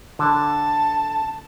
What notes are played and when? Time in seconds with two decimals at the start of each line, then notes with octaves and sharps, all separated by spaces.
0.19 D3 A5